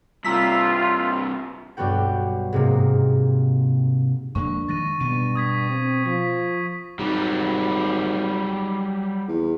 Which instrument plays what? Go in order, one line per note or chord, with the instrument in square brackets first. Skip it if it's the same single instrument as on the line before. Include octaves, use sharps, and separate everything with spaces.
[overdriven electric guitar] G2 C3 [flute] F4 [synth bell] A#5 E6 B6
[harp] B1 G2 G3 B3 F#4 G5
G#2 C3 G#3 A#3
[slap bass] F2 G#3 A#3 [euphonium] D4 [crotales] C#6
[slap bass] D#3 G#3 [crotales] A6 A#6 D#7
[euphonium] G2 [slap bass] B2 B3 [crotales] D#7
[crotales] D#6 G#6 B6
[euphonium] C4
[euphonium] F3 [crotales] B6
[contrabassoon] G#1 [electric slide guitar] F#3 G3
[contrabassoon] E2